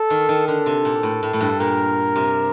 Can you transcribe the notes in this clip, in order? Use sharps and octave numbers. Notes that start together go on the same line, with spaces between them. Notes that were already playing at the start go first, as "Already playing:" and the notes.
Already playing: A4
D#3
D#3
D3 A4
C3
A#2
A2
A2
A2
G2
A#2 A#4
C3